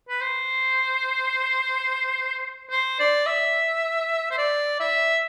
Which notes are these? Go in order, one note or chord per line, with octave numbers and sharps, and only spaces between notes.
B4
C5
C5
D5
E5
C5
D5
E5